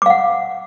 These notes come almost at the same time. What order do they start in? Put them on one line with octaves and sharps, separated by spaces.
D6 F5 F#5